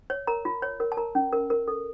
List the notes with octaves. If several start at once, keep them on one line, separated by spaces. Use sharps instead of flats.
C#5
A#4 A#5
F4
C#5
A#4
A5
A#4 A#5
C#4
A#4
A#4
A4